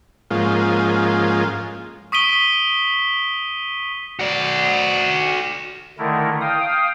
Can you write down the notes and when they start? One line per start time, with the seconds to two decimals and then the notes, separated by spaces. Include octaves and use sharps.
0.31 G#2 F3 G#3 A#3 C#4 F4
2.12 C#6 D#6 B6 D7 D#7 G7
4.19 F#4 D5
5.98 D3 D#3 A3 E4 A#4
6.41 F5 G5 D#6